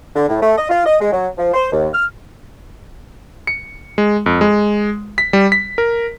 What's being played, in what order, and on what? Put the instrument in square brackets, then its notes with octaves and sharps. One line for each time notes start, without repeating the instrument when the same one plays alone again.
[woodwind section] D3
A2
A3
D#5
F4
D#5
G#3
F#3
F3
C5
D#2
F6
[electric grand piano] C#7
G#3
F2
G#3
B6
G3
B6
A#4